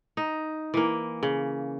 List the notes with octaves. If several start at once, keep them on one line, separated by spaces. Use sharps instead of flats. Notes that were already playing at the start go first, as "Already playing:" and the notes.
D#4
E3 A#3
C#3